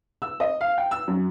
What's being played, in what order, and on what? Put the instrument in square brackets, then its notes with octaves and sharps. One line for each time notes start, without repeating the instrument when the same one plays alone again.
[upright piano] E6
D#5
F5
G5
E6
F#2